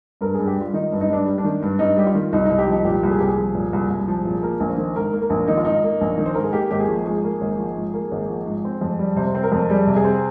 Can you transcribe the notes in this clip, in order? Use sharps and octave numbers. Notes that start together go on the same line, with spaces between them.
G2 A#4
G2 G#4
G4
G3 F4
D#3 D#4
G2
D#4
G2 D4
G3
D4
D#3
G2
G2 D#4
G3 G4
F4
D#3
C2 D#4
C2 D#4
G4
F3 D#4
A#2 G4
C2
G#4
C2 G4
G#4
F3
A#2
C2
C2
F3
A#2
A#3 A#4
A#1
C5
D#3
G#2 A#4
A#3
A#4
A#1
D#3 D#4
F4
G#2 D#4
A#3
A#1
D#3
C5
G#2 A#4
G#4
A#3 G4
G#1 G4
G#4
F3
G#2 G#4
A#3
G#1
F3
G#2
A#3
G#1
F3
G#2
C4
F2
G3
C3 C5
C4
A#4
F2
G3 G#4
C3
G#4
C4